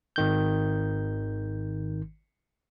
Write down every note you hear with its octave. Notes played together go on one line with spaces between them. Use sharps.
G#1 D#3 G6